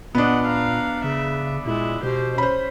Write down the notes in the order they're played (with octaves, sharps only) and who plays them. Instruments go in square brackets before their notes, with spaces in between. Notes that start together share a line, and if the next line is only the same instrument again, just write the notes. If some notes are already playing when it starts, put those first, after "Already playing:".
[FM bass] A#2 [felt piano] B3 D4 [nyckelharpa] D#5 F#5
[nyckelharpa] F5 A#5
[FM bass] C#3 [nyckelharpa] E5
[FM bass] A#2 [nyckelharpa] G#3 E4
[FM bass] B2 [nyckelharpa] G4 C5
[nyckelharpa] C#4 [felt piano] C5 B5